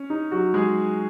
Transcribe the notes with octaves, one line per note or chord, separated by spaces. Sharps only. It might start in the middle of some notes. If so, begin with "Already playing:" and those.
Already playing: C#4
D#4
F#3 F#4
G#3 G#4